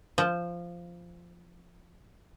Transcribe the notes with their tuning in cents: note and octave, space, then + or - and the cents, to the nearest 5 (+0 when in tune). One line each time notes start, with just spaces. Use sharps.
F3 -10